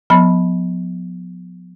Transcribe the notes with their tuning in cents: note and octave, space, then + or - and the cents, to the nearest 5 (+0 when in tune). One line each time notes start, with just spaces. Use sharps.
F3 +40 B3 +0 B5 -5